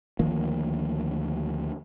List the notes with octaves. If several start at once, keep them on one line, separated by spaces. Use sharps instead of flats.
D2 D#3 F3 A#3